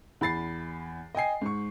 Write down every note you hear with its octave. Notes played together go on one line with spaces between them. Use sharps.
E2 B5 A6 C7
D#5 G5 G#5 C7
G#2 C#6